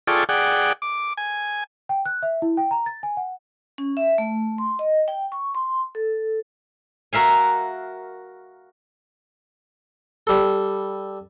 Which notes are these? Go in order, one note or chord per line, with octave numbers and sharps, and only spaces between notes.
F4 G#4 A4 D5 G5 C#6
G#4 D5 F#5 G5
D6
G#5
G5
F#6
E5
E4
G5
A#5
A6
G#5
F#5
C#4
E5
A3
C6
D#5
G5
C#6
C6
A4
F#4 A#4 E5 F5 G#5
G3 A4